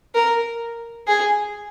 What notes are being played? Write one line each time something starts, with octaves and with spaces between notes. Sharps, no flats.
A#4
G#4